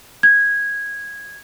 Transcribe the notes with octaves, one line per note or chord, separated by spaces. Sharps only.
G#6